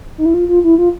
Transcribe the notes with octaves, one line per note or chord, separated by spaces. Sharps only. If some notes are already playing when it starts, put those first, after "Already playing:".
D#4
E4
F4
F4
E4
F4